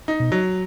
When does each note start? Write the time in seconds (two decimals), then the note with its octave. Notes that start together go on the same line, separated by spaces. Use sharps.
0.08 D#4
0.20 B2
0.32 F#3